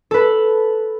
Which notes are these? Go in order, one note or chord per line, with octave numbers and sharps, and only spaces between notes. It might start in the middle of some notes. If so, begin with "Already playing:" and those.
A4 B4